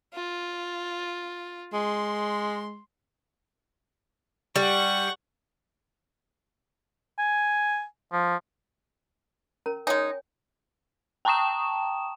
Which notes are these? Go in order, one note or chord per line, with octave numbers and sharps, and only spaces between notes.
F4
G#3 C6
G3 F#5 C#6
G#5
F3
C#4 A#4 A#5
G#3 D#4 C#5 G5 G#5
G5 A5 A#5 C#6 D#6 E7